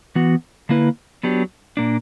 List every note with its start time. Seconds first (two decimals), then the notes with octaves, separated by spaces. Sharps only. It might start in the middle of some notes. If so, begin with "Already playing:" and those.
0.15 E3 B3 F#4
0.69 D3 A#3 E4 B4
1.23 F#3 B3 D4 G4
1.77 A#2 A#3 D4